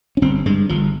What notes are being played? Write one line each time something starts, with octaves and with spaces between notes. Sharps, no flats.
C#4
G1 C4
G2 G#3
G1 F3